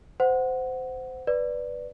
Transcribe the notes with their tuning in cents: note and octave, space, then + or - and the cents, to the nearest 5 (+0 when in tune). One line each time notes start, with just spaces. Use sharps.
C5 -20 F#5 +0
B4 +0 D5 +0